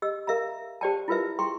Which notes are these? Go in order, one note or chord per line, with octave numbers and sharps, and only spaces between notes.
G4 D#5 E6
A#4 E5 F5 A#5
G4 C5 D5 G5 A5
E4 F4 A#4 B4 E5
G#4 G5 A#5 C6 C#6